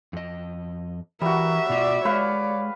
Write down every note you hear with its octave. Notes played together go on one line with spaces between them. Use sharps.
F2 D#5
E3 G3 F#4 A#4 E5
B2 F4 D5
G#3 B4 C#5 D5 F5